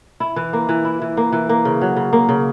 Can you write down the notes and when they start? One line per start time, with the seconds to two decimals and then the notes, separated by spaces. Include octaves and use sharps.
0.20 E4
0.36 E3
0.53 A#3
0.69 E3
0.85 E4
1.02 E3
1.17 A#3
1.32 E3
1.49 A#3
1.65 C#3
1.81 F#3
1.96 C#3
2.13 A#3
2.29 C#3